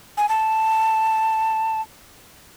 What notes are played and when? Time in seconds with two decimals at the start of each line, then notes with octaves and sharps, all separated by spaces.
0.17 G#5
0.29 A5